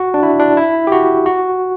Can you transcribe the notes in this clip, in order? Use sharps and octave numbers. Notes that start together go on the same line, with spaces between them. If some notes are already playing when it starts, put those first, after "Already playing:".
Already playing: F#4
D4
E4
D4
E4
G4
F#4
F#4